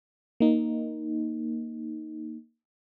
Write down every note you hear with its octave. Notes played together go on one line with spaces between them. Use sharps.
A#3 D#4